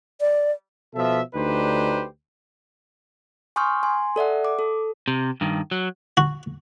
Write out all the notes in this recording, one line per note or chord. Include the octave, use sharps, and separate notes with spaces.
D5
B2 F3 A4 E5
D2 D4 D#4 G4 B4 C5
G#5 C6 C#6 D#6 F6 G6
G#5 C6
A4 D5 E5 F#5
D6
A4
C3
G2 D#3
F#3
F#4